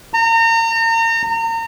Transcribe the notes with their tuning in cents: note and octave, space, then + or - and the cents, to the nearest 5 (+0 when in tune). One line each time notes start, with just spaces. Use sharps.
A#5 -35